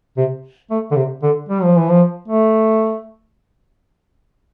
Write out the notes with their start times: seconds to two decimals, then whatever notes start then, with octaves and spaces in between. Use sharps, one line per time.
0.17 C3
0.71 A3
0.91 D3
0.97 C3
1.23 D3
1.49 G3
1.63 F3
1.77 E3
1.90 F3
2.29 A3